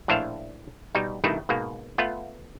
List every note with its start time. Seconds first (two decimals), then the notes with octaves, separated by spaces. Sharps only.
0.08 A#1 A2 D4 C5 E5 F5
0.95 B2 G3 D#4
1.24 G2 B2 D#3 A3 D#4 E4
1.49 G#2 B2 A#3
1.98 A3 B3 F4